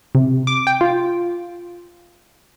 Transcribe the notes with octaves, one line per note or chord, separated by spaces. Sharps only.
C3
D6
G5
F4